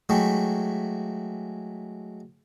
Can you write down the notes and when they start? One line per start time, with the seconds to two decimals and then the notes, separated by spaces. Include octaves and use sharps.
0.09 F#3 G#3 A3 E4 G4